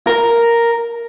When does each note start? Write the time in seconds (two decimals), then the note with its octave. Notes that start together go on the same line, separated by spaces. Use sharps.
0.07 A#4